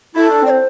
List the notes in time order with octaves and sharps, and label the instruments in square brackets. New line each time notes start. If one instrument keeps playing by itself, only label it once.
[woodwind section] E4 [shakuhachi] A4
[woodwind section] D4
[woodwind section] C4 [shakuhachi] D5
[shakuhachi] C5